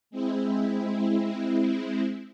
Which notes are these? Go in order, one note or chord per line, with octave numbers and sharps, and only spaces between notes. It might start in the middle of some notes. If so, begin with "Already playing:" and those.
G#3 C4 E4